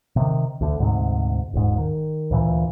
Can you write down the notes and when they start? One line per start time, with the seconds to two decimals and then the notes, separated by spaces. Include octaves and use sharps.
0.16 C3 D#3
0.61 D2 D3
0.80 D2 G#2 C3
1.54 D#1 G#2
1.78 D#3
2.31 D2 A#2 E3